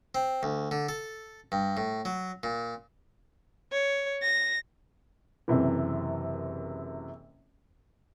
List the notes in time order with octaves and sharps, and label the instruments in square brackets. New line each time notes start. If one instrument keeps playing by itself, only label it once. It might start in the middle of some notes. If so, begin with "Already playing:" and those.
[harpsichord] C4
D2
D3
A4
G2
A2
F#3
A#2
[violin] C#5
A#6
[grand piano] F#1 F#2 C3 E3